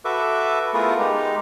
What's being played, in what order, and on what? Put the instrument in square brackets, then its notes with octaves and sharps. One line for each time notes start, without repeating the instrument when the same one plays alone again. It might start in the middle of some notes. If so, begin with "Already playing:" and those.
[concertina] F#4 A4 B4 E5 D6
A3 B3 E4 F4 G#4 A#4
G#3 D#4 G4